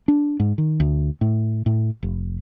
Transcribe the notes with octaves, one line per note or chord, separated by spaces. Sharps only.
D4
G#2
D#3
D2
A2
A2
F1